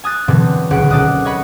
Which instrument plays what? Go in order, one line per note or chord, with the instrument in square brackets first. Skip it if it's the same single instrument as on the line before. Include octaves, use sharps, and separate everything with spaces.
[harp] G#5 D#6 F#6 A6
B2 D3 E3 F#3 G3 C4
D#1 C#2 F#5 D7
A4 C5 D5 D#5 D#6 F#6
C#5 D#5 F#5 B5